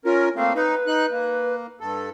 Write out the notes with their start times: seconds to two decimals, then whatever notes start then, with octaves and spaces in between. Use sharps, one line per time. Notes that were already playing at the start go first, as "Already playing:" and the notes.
0.05 C#4 F4 A#4
0.36 A3 A#3 C4 F5
0.56 D#4 B4
0.87 D#4 F#6
1.11 A#3
1.80 G2 A4